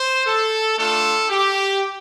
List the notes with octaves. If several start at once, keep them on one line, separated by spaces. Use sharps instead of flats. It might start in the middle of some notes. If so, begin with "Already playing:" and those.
Already playing: C5
A4
A3 D4 F4 A4
G4